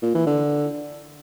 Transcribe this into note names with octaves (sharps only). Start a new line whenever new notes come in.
A#2
E3
D3